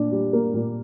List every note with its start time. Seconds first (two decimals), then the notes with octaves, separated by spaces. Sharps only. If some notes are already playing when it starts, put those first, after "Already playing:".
Already playing: A#2 D4
0.12 G3
0.33 A#3
0.54 A#2